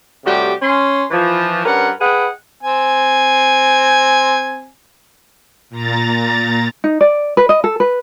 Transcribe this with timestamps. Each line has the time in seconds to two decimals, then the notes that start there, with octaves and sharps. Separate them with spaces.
0.25 A2 C3 G3 F#4 G4
0.61 C#4 C6
1.11 E3 F3
1.64 G2 C#4 A#4 B4 F#5
2.00 G#4 B4 D#5 F#5 G5
2.63 C4 G#5
5.70 A#2 A#5 A6
6.84 D#4
7.01 D5
7.37 B4
7.49 D#5
7.64 A4
7.80 B4